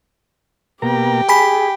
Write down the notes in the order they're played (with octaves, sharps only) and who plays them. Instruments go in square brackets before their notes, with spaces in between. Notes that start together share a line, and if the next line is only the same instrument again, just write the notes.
[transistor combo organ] B2 A#3 A#5 [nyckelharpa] G4 G5
[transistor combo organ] G#4 [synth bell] G#5 B5 B6